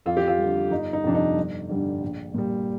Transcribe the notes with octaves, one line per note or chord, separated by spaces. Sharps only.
F2 F4
G4
F4
D3 G3
G1 D#4
D#4
F2 C3 F3 D4
D#4
G1
G2 D3 G3
A#1
A#2 G3